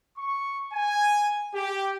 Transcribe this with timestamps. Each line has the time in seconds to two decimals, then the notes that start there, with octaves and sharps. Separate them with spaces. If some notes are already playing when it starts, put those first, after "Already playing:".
0.18 C#6
0.73 G#5
1.55 G4